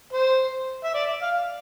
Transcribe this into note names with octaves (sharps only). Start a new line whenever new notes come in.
C5
E5
D5
F5